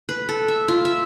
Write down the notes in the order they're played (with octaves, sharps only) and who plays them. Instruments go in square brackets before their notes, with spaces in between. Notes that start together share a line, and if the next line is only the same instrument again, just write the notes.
[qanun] B4
A4
E5
F4
E5